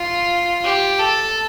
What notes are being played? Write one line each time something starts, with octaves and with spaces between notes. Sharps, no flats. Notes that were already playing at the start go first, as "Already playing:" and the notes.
Already playing: F4
G4
A4